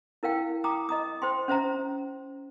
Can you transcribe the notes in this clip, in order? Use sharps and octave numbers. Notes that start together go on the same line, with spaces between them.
E4 A#4 F5 G5
G5 A#5 D6 D#6
D#5 A#5 D#6
C5 G5 C6
C#4 C5 E5 A#5